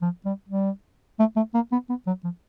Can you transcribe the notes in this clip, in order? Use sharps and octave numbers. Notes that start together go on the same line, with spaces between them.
F3
G3
G3
A3
A3
A#3
B3
B3
F#3
F3